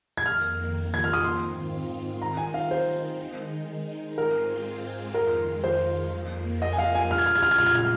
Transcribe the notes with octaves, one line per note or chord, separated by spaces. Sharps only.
G#6
F2 D#3 A#3 F6
G#6
F6
D#6
G#2 D#3 C4 F4 C6
D#3 C4 D#4 A#5
G#5
F5
C5
D#3 G#3 D#4
G#2 G#3 C4 F4 A#4
F2 D#3 G#3 F4 A#4
C5
F2 F3 A#3
D#5
G#5
F5
G#5
A#2 G#3 F4 F6
G#6
F6
G#6
F6
G#6
F6
G#6
F6